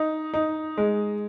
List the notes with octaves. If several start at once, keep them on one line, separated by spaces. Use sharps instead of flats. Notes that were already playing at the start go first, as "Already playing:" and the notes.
Already playing: D#4
D#4
G#3